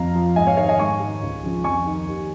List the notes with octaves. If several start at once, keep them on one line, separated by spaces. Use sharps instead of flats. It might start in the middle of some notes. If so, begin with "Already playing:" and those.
Already playing: F2 F5 A#5
F3
G#2 D#5 G#5
C#5 F5
D#3 C#5 F5
D#5 G#5
G#2 G#5 C#6
D#3
C#2
C#3 F3
F2 G#5 C#6
D#3
D#2